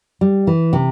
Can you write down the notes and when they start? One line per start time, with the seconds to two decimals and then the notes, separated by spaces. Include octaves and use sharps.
0.21 G3
0.47 E3
0.73 C3